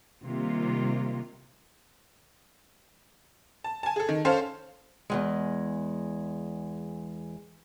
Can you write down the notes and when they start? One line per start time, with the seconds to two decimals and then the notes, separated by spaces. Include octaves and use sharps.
0.24 C3 D#3 G3 A#3 F4
3.64 A5
3.83 G#5 A5
3.96 G#4 A4
4.09 D#3
4.25 C#4 A4 C5 F5
5.10 E2 G2 G#3